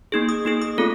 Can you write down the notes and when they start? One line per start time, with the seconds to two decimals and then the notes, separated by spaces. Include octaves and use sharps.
0.12 A#3 D#4 G#4
0.29 D#6
0.45 A#3 D#4 G#4
0.62 D#6
0.78 A3 C4 F4 A4